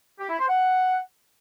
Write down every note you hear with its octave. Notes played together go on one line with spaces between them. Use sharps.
G4
E4
C5
F#5